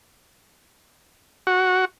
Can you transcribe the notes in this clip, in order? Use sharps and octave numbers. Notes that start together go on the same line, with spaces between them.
F#4